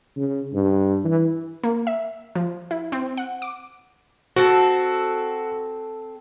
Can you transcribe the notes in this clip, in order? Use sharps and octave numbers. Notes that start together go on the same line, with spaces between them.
C#3
G2
E3
A#3
E5
F3
E4
C4
F#5
D6
C4 F#4 A4